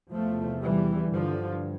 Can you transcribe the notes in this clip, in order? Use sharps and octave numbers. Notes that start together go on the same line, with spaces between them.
E2 C3 F3 A3
E3 G3
G2 D3 F3